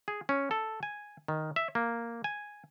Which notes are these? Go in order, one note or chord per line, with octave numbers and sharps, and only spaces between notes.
G#4
C#4
A4
G#5
D#3
E5
A#3
G#5